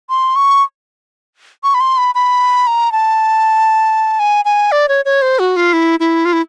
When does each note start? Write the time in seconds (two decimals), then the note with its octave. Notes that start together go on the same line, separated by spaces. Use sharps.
0.10 C6
0.36 C#6
1.63 C#6
1.74 B5
1.80 C6
1.97 B5
2.15 B5
2.67 A#5
2.92 A5
4.19 G#5
4.45 G#5
4.72 D5
4.88 C#5
5.05 C#5
5.22 C5
5.39 F#4
5.56 F4
5.73 E4
6.00 E4
6.25 F4
6.33 E4